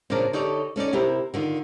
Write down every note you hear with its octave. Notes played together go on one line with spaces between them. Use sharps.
A#2 C#3 F3 D4 A#4 D5
D3 D#4 G4 A4 C#5 D5
A3 C#4 D#4 D5
C3 E4 G4 A#4
D3 D#3 F4